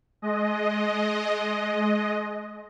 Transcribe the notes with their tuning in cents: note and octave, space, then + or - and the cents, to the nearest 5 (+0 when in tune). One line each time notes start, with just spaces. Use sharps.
G#3 +30 D#5 +0